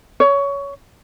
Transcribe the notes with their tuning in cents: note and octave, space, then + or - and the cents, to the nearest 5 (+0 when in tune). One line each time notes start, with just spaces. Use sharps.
C#5 +20